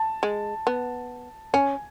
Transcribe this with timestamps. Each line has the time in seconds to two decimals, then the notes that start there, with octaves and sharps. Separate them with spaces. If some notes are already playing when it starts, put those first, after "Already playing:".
Already playing: A5
0.23 G#3
0.67 B3
1.54 C#4 G#5